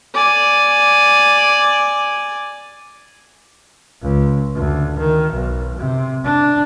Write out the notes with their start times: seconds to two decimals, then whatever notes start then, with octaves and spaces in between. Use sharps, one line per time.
0.14 D5 G#5
4.02 C#2
4.55 D2
4.99 D#3
5.34 B1
5.78 C3
6.24 D4